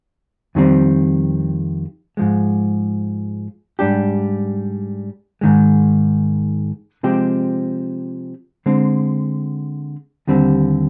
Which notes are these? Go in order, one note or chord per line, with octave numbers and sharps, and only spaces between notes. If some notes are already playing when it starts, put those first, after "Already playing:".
F2 D#3 G3 C4
G#2 F3 G#3
G#2 G3 D4 G4
G#2 D#3 G#3
C3 F3 G#3 C4 G4
D3 G#3 C4
D#2 D3 G3 C4